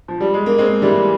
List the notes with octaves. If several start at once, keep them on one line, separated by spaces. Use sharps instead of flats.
F3
G3
G#3
A#3
G#3 C4
E3 G3